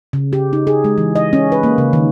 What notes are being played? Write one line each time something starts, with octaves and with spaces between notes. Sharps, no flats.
C#3
G4
D#4
G#4
G#3
E3
D#5
C#4
B4
A#3
C#3
D#3